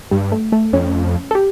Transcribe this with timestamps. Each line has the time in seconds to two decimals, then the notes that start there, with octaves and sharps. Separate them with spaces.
0.11 G2 G3
0.32 A3
0.52 A3
0.73 F2 C#4
1.31 A4
1.35 G4